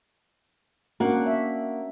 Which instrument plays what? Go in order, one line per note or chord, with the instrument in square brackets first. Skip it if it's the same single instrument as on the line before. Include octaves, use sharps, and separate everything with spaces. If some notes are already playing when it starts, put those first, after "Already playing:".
[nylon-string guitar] A#3 F#5 [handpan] C#4 D4 F#4
[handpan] E5